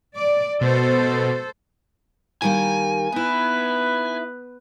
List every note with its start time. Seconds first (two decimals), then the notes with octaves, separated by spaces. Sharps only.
0.16 D5
0.61 B2 A4 C5
2.42 D#3 G3 A#3 G#5
3.12 B3 D#4 E4 B4